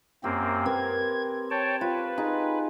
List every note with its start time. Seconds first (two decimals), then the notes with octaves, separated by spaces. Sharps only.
0.24 F#2 A#3 C4 G4
0.66 C4 A#4 B4 G#6
1.51 C#5 G5 A5
1.81 F4 B4
2.18 D#4 G#4